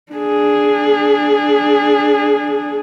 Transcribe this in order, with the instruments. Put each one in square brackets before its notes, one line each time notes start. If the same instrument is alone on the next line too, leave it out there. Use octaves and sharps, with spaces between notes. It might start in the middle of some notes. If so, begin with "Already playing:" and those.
[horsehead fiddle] D4 G#4